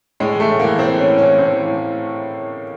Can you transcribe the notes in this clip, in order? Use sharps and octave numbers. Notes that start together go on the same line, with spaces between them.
A2 G#3
E3 A3
A2
E3 A#3
A2 C4
E3 C#4
A2
E3 C#4
A2 C4
E3
A2